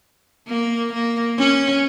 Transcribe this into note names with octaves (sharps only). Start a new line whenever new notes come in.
A#3
A#3
C#4